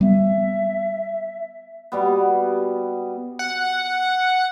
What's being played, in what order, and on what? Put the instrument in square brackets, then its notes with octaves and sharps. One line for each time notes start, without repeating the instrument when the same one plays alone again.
[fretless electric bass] G3 B3 [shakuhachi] E5
[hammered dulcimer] B2 G3 B3
[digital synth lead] F#5